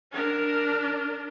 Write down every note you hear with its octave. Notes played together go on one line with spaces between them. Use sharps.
D4 A#4